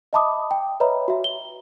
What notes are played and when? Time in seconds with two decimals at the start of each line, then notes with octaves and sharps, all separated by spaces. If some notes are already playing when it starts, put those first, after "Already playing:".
0.13 D#5 E5 A5 B5 D6 D#6
0.51 G5
0.80 B4 C#5 D#5 E5 A#5 B5
1.08 F#4 E5
1.24 G7